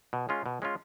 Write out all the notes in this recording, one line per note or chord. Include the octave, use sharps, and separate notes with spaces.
B2
G#3 C#4 F4
B2
G#3 C#4 F4